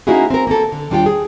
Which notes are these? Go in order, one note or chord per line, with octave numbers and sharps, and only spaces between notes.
A#3 C#4 D#4 E4 F#4 G#4
C4 A#4
A#3 C4 A4
D3
D#2 G3 D4 F4 G4 G5
G#4